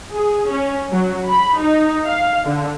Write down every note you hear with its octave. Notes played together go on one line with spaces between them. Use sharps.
G#4
C#4
F#3
B5
D#4
F5
D3